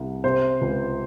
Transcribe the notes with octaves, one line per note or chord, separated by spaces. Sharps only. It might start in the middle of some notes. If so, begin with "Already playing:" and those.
Already playing: C2
C3 C5
C#2